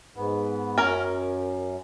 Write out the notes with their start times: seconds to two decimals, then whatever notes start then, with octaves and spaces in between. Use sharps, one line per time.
0.17 G#2 B3
0.78 F#2 C#4 A#4